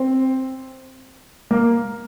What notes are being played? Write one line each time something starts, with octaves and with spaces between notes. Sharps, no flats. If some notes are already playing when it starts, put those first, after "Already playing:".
Already playing: C4
A#3